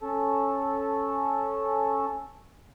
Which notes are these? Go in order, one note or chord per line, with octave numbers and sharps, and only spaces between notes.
C#4 A4